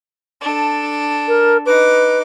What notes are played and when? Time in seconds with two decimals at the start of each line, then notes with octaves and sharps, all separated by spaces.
0.41 D4 A4
1.28 A#4
1.66 D#4 B4 D6